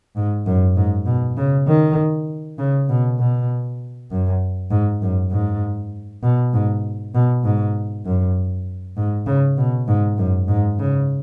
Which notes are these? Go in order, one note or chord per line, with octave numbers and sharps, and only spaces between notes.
G#2
F#2
G#2
B2
C#3
D#3
C#3
B2
B2
F#2
G#2
F#2
G#2
B2
G#2
B2
G#2
F#2
G#2
C#3
B2
G#2
F#2
G#2
C#3